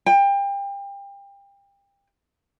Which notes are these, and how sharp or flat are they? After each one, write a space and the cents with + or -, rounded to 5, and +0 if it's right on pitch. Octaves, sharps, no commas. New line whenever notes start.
G5 +30